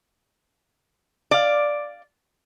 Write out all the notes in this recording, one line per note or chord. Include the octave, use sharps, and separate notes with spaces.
D5 F5